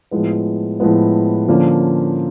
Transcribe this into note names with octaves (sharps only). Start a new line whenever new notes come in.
A2 F3 G#3 B3
A2 F3 G#3 B3
D3 F3 A#3 C#4